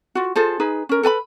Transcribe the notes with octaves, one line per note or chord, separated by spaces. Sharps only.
F4 F#4
F4 G#4 A4 C5
D#4 G#4 B4
C#4 A#4
A4 B4 G#5 B5